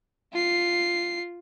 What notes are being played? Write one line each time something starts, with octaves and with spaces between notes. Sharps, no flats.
F4 C7